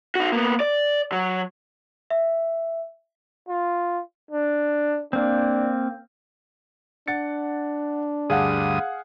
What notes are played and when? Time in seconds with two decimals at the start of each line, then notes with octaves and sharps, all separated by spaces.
0.15 D#4 F#4
0.32 A#3 B3
0.60 D5
1.12 F#3
2.10 E5
3.49 F4
4.31 D4
5.13 A#3 C4 D4
7.08 D4 F#5 A6 C#7
8.30 D2 G2 G#4 F5 F#5 D#6